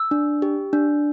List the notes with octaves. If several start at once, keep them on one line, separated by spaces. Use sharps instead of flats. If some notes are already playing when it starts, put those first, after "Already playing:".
Already playing: E6
D4
G4
D4